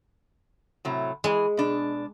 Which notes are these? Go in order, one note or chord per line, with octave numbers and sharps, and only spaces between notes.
A2 C3 F#3
E3 G#3 G#4
B2 D4